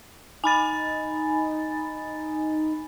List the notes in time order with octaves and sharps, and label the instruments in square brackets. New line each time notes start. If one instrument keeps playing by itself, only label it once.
[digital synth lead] D#4 [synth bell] G#5 B5 A6